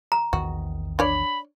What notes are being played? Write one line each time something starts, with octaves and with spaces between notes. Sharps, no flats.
A#5
A#1 E2 D#3 F#4
D4 C#5 D5 B5